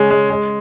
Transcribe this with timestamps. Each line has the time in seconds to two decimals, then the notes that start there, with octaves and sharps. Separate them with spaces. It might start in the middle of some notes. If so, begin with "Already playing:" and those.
Already playing: C#3 G#3 C#4
0.10 G#3
0.30 G#3